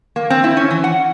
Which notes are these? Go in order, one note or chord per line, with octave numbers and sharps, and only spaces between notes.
A#3
C4
E4
C#4
E3
F#5